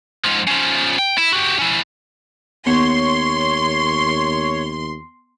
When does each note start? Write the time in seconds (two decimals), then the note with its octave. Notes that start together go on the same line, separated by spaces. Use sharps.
0.25 G#2 F3
0.48 C#3 F3
0.99 G5
1.17 E4
1.32 F#4 G4
1.58 C#4 E4
2.67 D#2 B3 C#5 C6